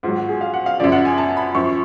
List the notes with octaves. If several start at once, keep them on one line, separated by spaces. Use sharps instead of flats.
G#2 F#3 F4
F#4
G#4
F5
F#5
F5
F#2 C#3 F3 D5
F#5
G#5
A5
B5
F#2 F3 C#6